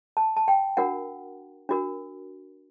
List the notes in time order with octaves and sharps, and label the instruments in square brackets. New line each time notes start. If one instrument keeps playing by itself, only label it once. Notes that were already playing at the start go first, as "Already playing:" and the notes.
[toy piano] A5
A5
G5
D4 F#4 A#4 F#5
D4 F#4 A#4